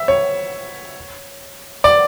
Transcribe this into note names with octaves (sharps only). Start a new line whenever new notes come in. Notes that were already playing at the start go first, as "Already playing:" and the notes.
Already playing: E5
C#5
D5